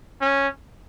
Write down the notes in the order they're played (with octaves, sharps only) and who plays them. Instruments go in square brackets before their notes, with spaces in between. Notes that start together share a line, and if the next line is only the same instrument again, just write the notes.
[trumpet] C#4